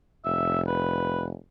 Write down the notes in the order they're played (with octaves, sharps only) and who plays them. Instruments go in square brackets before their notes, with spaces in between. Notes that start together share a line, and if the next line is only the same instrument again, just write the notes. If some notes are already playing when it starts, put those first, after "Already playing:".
[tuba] F1 [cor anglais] E5
[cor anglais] B4